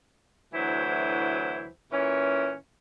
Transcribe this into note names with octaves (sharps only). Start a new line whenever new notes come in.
D2 E3 F#3 E4 C5
A#2 E3 C#4